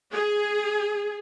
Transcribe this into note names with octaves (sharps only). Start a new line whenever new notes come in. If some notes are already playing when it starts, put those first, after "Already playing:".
G#4